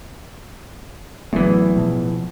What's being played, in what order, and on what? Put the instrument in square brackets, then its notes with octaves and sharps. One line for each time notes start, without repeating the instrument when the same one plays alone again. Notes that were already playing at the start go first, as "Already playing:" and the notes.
[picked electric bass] A1 F#3 A3 [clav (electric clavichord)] E2 E3
[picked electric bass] B2 F3